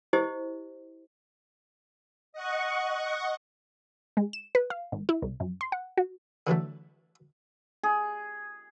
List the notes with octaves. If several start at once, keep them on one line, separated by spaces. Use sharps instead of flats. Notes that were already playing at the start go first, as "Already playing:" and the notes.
E4 G4 C5 D#5
D#5 F#5 C#6
G#3
E7
B4
F5
G#1
E4
C2
F#2
C6
F#5
F#4
D3 E3 F#3 A3
G#4